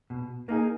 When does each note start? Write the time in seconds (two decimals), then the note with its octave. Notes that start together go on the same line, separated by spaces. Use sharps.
0.10 B2
0.49 A#3 D#4 G#4